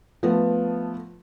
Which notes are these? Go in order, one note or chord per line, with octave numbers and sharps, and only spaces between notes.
F3 A3 B3